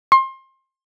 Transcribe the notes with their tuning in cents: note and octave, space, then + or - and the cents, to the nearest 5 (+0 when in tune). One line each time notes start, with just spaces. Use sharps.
C6 +30